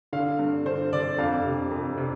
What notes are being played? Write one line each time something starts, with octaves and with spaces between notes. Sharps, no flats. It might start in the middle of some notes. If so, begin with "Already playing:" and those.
D3 F5
G2
D3 C5
D3 D5
F2 F5
C3
F2
C3